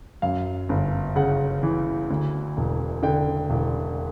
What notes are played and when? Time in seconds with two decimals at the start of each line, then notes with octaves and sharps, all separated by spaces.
0.22 F#2 F5
0.69 G1
1.16 C#3 F#5
1.63 E3
2.10 D2
2.57 E1
3.03 D3 G5
3.50 E1